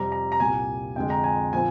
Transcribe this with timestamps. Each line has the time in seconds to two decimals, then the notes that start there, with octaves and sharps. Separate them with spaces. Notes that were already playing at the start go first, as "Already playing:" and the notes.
Already playing: F2 C3 G3 C4 A#5
0.12 A#5
0.32 A#5
0.40 C2 A#2 G3 G#5
0.96 F2 D3 G#3 G5
1.10 A#5
1.24 G#5
1.53 A#2 F3 C4 G#5